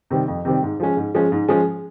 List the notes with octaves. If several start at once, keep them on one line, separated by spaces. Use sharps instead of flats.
C3 D#3 G3 C4
F2
C3 D#3 G3 C4
G#2
F3 G#3 C#4
G#2
F3 G#3 C#4
G#2
F3 G#3 C#4